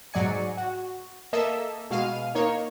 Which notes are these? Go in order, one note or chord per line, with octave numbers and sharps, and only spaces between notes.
G#2 F#3 D5 G#5 C#7
F#4
A#3 A4 D#5 E5 E6
B2 G#3 F5 F6 D#7
A#3 D#4 C#5